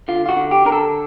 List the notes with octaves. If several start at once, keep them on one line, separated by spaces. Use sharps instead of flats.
D3 F4
F4
F#4
D3
G4
D3 A#4
A4